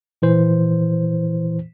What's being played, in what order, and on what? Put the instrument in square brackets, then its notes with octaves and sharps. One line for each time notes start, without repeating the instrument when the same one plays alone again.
[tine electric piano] A#2 E3 C5